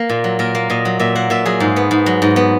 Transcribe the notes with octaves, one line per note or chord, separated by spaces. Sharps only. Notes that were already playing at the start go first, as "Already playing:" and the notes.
Already playing: A#3
A#2
F#3
A#2 A#4
A#3
A#2 D#5
F#3
A#2 E5
A#3 F#5
A#2 E5
F#3 G#4
G#2
B3
G#2
F#3
G#2
B3